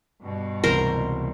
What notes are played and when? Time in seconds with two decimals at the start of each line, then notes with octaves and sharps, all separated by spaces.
0.24 G2 B2
0.64 C#2 C3 E3 A#4 C5